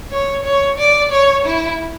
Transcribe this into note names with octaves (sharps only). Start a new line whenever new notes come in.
C#5
C#5
D5
C#5
E4